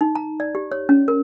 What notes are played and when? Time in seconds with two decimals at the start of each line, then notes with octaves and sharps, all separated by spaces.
0.01 D#4
0.15 A#5
0.40 D5
0.55 G4
0.72 C#5
0.89 C#4
1.08 A#4